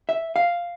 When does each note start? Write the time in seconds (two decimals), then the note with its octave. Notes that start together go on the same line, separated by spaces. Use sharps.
0.09 E5
0.36 F5